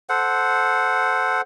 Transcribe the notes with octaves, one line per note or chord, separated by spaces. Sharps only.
A4 C5 F#5